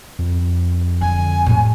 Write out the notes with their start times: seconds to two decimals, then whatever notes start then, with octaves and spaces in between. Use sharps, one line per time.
0.19 F2
1.01 D3 G#5
1.46 A2 G3